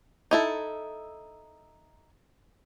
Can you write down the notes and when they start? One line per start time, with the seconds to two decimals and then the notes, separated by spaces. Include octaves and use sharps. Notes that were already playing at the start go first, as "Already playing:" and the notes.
0.31 D#4 E4 A4